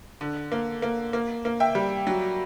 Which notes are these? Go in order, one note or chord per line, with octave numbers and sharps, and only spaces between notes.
D3
A#3
A#3
A#3
A#3
E5 G5
G3
F#3